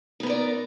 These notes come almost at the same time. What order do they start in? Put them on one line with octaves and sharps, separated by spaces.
D#4 B3 A#4 D5